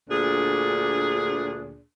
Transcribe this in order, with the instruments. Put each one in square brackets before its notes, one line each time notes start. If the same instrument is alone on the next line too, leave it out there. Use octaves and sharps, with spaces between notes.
[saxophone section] D2 A#2 D4 G#4